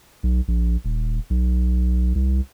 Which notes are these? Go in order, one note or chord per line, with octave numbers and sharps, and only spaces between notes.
B1
A#1
D#1
B1
C2